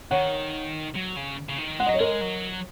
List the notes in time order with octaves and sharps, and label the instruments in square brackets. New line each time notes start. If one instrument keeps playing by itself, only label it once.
[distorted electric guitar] D#3 [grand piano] C#5 F#5
[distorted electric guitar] F#3
C#3
C#3
D#3
[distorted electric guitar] G#3 [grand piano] F#5
[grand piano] D#5
[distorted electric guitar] F#3 [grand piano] C#5
[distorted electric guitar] G#3 [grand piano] A#4 D#5
[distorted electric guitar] F#3